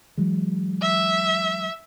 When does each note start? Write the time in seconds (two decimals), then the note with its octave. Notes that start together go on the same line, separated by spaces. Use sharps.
0.18 E3 F#3 G#3
0.82 E5